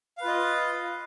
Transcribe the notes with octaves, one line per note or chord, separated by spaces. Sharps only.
F4 B4 D#5 F5